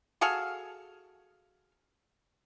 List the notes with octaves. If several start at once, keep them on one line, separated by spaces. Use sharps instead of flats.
F#4 G#4 A4 F5